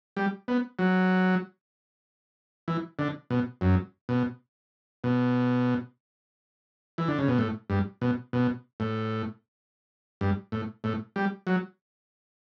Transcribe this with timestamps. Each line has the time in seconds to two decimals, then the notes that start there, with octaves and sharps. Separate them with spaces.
0.17 G3
0.48 B3
0.79 F#3
2.68 E3
2.99 D3
3.30 B2
3.61 F#2
4.09 B2
5.04 B2
6.98 E3
7.08 D3
7.19 C#3
7.28 B2
7.39 A2
7.70 G2
8.02 B2
8.33 B2
8.80 A2
10.21 G2
10.52 A2
10.84 A2
11.16 G3
11.47 F#3